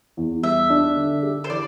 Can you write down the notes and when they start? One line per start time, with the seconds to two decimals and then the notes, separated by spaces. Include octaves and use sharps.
0.17 E2
0.43 G3 E5
0.70 D4
0.96 D3
1.23 G4
1.44 C5
1.49 E3 D5